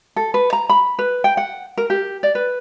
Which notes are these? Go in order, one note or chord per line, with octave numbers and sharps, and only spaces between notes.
A4
B4
A#5
B5
B4
G5
F#5
A#4
G4
D5
B4